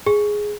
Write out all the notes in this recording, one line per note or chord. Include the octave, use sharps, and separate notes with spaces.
G#4